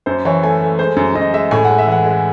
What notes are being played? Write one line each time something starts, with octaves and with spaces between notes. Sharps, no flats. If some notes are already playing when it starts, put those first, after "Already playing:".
F#2 C5
E3 C#5
A3 G#5
A3
G#3 C5
F#2
F#2 D#5
G#3 E5
A2 G#5
F#5
G#3
E5
E3 F#5
G#3